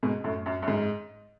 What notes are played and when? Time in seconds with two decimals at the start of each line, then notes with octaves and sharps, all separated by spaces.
0.03 G#2 B2
0.24 F#2 A2
0.46 F#2
0.62 F#2
0.68 G#2